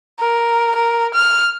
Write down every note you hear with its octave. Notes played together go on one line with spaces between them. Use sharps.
A#4
A#4
F6